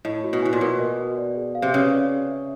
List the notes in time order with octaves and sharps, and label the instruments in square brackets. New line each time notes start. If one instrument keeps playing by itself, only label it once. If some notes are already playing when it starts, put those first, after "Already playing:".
[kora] A2 [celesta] D#5
[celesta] F#4
[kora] B2
[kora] A2 [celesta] G#5
[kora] A#2
[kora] B2 [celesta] A#4
[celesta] D#5
F#4
D5
G#4
F5
[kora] C3
[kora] C#3 [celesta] B4
[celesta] D5
G#4
E5